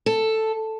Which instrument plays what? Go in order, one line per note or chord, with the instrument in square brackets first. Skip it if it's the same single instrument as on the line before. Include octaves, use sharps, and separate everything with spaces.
[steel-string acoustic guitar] A4